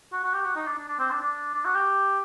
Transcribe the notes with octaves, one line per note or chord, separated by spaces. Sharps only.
F#4
F#4
G4
F#4
D#4
D4
D4
D4
C4
D4
D4
D4
F#4
G4